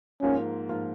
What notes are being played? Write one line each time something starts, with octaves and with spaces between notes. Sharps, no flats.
G#2 F3 A#3 C#4 F4 A#4
G#2 F3 A#3 F4 A#4